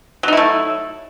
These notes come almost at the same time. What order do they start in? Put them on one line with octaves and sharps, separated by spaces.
F#3 D#4 E4 A3